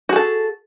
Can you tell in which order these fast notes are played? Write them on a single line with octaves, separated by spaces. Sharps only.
F#4 G#4 A4